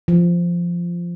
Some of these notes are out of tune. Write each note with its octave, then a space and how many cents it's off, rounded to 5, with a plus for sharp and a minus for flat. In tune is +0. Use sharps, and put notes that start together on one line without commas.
F3 -10